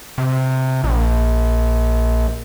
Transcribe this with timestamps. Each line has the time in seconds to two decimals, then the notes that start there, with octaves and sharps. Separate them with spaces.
0.18 C3
0.84 A#1